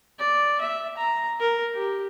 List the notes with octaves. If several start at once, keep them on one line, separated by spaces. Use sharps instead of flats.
D5
E5
A#5
A#4
G4